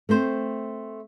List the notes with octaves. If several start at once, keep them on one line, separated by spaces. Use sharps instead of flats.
A3 C4 C5